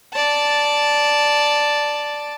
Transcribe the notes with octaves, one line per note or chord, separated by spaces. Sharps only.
D5 A5